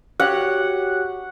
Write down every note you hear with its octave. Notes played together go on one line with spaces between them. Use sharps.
F#4 G4 C#5 F#5